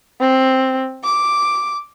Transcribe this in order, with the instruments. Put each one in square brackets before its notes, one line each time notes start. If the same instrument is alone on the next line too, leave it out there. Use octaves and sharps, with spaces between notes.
[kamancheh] C4
D6